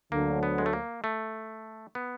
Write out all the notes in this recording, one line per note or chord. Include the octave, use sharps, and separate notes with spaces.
D2 D3 F#3 A#3
B3
G#3
A3
A#3
A3
B3